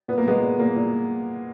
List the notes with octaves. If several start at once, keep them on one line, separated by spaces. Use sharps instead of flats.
A#2 B3
A#3
A#2 G#3 B3
A#2
A#2 A#3
A#2